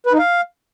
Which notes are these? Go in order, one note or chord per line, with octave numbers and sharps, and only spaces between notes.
B4
D#4
F5